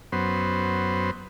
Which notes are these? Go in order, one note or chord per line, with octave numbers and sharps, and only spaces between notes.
F#2 B3 C5